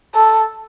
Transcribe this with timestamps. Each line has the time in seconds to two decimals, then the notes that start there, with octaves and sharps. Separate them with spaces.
0.15 A4